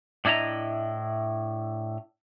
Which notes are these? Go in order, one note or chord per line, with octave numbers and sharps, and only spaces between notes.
A2 D4 E4 D#5 A#5